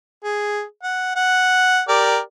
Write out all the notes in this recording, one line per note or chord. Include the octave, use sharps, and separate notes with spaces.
G#4
F#5
F#5
G4 A#4 D5